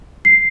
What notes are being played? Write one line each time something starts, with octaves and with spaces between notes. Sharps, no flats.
C7